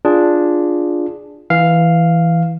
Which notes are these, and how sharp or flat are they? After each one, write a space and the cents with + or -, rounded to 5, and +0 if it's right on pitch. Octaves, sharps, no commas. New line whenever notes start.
D4 +0 F4 +0 G#4 +0
E3 +0 F5 +0